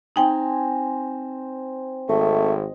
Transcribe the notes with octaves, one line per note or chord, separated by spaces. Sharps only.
C4 D#4 G5 G#5 A#5
G#1 A3 D#5